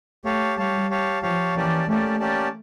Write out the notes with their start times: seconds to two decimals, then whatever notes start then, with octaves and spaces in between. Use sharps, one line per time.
0.25 A3 G4 C#5 F5 A5
0.57 G3 G4 C#5 F5 A5
0.90 G4 C#5 F5 A5
1.22 F3 G4 C#5 F5 A5
1.55 E3 A#3 C#4 G4 D5 A5
1.87 A3 A#3 C#4 G4 D5 A5
2.19 A#3 C#4 G4 D5 A5